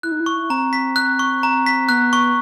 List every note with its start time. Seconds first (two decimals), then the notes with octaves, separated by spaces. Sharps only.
0.03 E4 F#6
0.12 D#4
0.20 E4
0.26 C#6
0.50 C4 A#5
0.73 B6
0.96 F#6
1.19 C#6
1.43 A#5
1.66 B6
1.89 B3 F#6
2.13 C#6